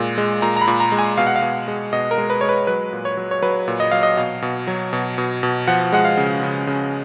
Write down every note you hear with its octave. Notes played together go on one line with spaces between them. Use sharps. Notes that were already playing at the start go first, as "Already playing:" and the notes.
Already playing: A#2 G#3
G#3
A#2 A#5
A#5
B5
A#2
A#5
G#3
G#5
B2 F5
F#5
F5
B2
G#3
B2 D#5
A#4
G#3
B4
G#3 C#5
B4
F#3 B4
A#2
C#5
F#3
C#5
F#3 B4
A#2
D#5
F#3 F5
D#5
B2 F5
B2
F#3
B2
B2
B2
F3 F#5
G#3 F#5
F5
C#3
C#3
C#3